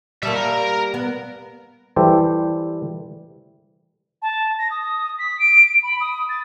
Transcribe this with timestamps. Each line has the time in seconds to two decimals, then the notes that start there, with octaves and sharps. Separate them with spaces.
0.23 G3 A#3 E5 A5
0.36 A#4
0.94 B3
1.96 E3 G3 G4 A4 C5
4.22 A5
4.58 A#6
4.71 D#6
5.19 B6
5.39 D7
5.66 D7
5.83 B5
6.01 D#6
6.29 A6